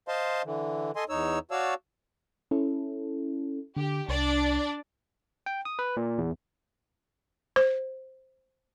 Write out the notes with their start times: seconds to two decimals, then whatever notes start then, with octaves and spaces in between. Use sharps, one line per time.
0.08 C5 D#5 F5 A5 C6
0.45 D3 E3
0.96 A4 D#5 G#5 C6
1.09 E2 D#4 C#5 E6
1.51 F#4 C#5 D5 F5 A5 E6
2.51 C#4 E4 A4
3.77 D3 G4
4.09 C2 D4 D5
5.46 G5
5.65 D#6
5.79 B4
5.97 A#2
6.18 E2
7.56 C5